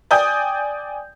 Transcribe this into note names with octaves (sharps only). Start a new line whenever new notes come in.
D5 G5 G#5 D#6 G6